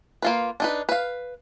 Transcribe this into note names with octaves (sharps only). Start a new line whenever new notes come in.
A#3 F4 B4
D4 D#4 B4
B4 F5